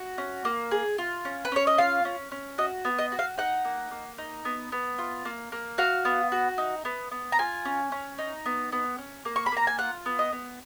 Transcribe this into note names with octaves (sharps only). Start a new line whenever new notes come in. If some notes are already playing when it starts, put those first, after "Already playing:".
Already playing: F#4
C#4
A#3
G#4
F4
C#4
B4
C#4 C#5
D#5
F4 F5
C#4
C#4
F#4 D#5
B3
D#5
F#4
F5
D#4 F#5
A#3
A#3
D#4
B3
B3
F4
A#3
A#3
F#4 F5
B3
F#4
D#4
B3
B3
A#5
F4 G#5
C#4
C#4
D#4
B3
B3
C#4
A#3
C#6
B5
A#3 A#5
G#5
F4 F#5
B3
D#5
B3